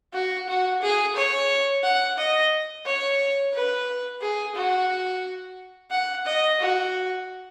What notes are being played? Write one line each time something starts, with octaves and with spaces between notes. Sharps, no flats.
F#4
F#4
G#4
C#5
F#5
D#5
C#5
B4
G#4
F#4
F#5
D#5
F#4